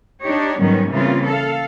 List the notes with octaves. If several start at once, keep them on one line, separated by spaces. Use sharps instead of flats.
D4 D#4 G4 C#5
G#2 D#3 F#3 G3 B3 C#4
C#3 E3 G3 A#3 C4 F4
A4 F5